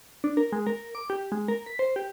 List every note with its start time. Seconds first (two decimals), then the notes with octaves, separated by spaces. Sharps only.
0.24 D4
0.37 A#4
0.52 G#3
0.67 A#4
0.95 D6
1.10 G4
1.32 G#3
1.48 A#4
1.66 B6
1.79 C5
1.96 G4